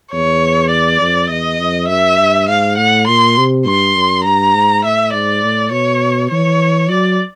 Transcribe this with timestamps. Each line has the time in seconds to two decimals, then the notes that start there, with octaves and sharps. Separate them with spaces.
0.12 E2 C#5
0.71 D5
1.00 F2
1.30 E2 D#5
1.60 F2
1.89 F#2 E5
2.18 G2
2.48 G#2 F5
2.77 A2 F#5
3.07 A#2 C6
3.37 C3
3.66 G2 C6
3.95 F#2
4.25 G2 A#5
4.54 G#2
4.84 A2 E5
5.13 G#2 D5
5.43 A2
5.72 B2 C#5
6.31 E3 C#5
6.90 F#3 D5